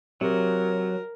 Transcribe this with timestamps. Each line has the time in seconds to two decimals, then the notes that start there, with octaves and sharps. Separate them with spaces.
0.21 C3 F#3 A#4